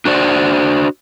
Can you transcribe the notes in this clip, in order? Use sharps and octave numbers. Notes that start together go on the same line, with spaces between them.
D4 F#4 C5 D5